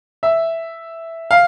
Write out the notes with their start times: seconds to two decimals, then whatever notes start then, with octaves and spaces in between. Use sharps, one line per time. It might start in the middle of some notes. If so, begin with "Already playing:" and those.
0.23 E5
1.31 F5